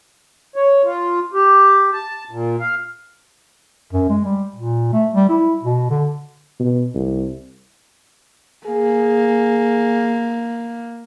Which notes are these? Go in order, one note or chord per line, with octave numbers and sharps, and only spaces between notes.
C#5
F4
G4
A5
A#2
F5
F#2
G#3
G3
A#2
A3
G3
E4
B2
D3
B2
C2
A#3 G#4